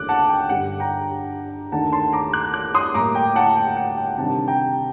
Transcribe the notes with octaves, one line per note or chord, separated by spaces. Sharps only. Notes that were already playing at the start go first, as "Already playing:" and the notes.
Already playing: D#2 D3 A3 D6 F#6
F#5 A5
G5
G2 D3 G3 F#5
G5 A#5
D#2 D#3 A3 D4 F#5 A5
A5 C6
A#5 D6
D6 F#6
D6 F#6
C6 D#6
A2 G3 A#3 A#5 D6
G5 A#5
F#5 A5
G5
F#5
G5
C3 D#3 G3 D4 F#5 A5
G5 A#5